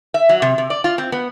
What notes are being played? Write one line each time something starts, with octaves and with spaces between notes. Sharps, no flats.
E5
F#3
C3
C3
D5
F4
C4
B3